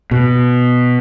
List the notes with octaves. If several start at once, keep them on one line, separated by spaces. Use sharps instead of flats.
B2